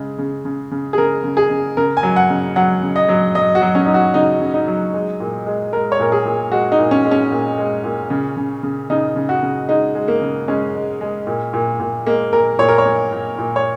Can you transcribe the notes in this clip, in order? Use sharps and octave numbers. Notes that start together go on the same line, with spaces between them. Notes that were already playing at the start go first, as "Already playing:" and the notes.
Already playing: C#3 G#3
C#3
C#3
C#3
G#4
C#3 A#4
C#3
G#4
C#3
C#3 A#4
G#5
F#3
F#5
C#3
F#3 F#5
C#3
D#5
F#3
F#3 D#5
F#4
F#3
C#4
F#3 D#4
F#4
C#3 D#4
C#3
D#4
F#3
G#3
A#2
G#3
G#3 A#4
C#5
A#2 A#4
G#4
A#2
G#3 F#4
D#4
A#2
C#4
G#3
C#4
A#2
G#3
A#2
C#3
C#3
C#3
C#3 D#4
C#3
F#4
C#3
G#3 D#4
G#3
A#3
C#3
G#3 C#4
G#3
G#3
A#2
A#2
A#2
G#3 A#3
A#2 A#4
A#2 C#5
A#4
C#5
A#2
A#2
A#2
C#5